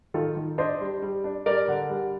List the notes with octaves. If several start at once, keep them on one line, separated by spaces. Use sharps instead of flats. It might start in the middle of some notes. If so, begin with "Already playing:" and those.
D#3 F4 A4
D#3
D4 C5 D#5
G3
G3
D4
G3 A#4 D5
D3
G3